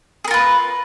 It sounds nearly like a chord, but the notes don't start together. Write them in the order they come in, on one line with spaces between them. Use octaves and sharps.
G#4 A#4 F4 B4